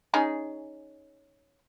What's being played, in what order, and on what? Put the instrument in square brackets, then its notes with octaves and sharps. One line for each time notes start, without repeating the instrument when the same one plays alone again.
[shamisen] C#4 D#4 G#4